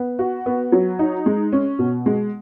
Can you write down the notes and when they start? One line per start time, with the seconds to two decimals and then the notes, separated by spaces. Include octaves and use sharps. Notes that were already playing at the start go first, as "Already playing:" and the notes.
Already playing: B3
0.19 F#4
0.46 B3
0.72 F#3
0.99 D#4
1.26 G#3
1.53 C#4
1.79 B2
2.06 G#3